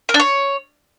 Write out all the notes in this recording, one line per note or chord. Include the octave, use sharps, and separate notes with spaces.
A#4
D4
C#5